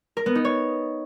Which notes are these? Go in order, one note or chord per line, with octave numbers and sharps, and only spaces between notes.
A#4
B3
D#4
C#5